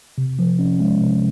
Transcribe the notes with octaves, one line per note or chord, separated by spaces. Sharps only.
C3
F3
C#4
G#3
C3